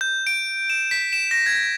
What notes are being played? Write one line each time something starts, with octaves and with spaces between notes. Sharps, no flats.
G6
D7
E7
B6
E7
A#6
G#6